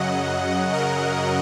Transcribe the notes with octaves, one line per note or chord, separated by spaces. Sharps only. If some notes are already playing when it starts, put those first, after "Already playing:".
Already playing: F#2 C#3 F#3 D#5 F#5
A#4